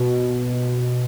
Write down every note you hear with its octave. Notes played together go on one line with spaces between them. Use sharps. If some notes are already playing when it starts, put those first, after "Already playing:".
Already playing: B2